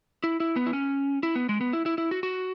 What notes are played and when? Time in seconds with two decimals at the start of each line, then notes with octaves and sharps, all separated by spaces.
0.24 E4
0.40 E4
0.56 B3
0.66 E4
0.73 C#4
1.23 E4
1.35 B3
1.49 G#3
1.61 B3
1.73 E4
1.86 E4
1.98 E4
2.11 F#4
2.23 F#4